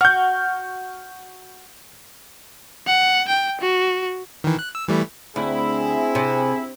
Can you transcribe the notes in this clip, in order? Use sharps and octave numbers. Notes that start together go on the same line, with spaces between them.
F#4 F6 G6
F#5
G5
F#4
D#3 E3
F#6
E6
E3 G3 A3
D2 C4 E4 G#4
C3